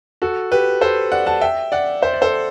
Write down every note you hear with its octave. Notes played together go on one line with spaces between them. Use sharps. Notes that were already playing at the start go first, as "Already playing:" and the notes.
F#4 A4
G4 B4
A4 C5
D5 F#5
F#5 A5
E5 G5
D5 F#5
C5 E5
D5
A4 C5